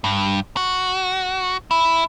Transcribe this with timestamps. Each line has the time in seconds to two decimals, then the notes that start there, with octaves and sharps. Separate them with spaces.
0.04 G2
0.57 F#4
1.71 E4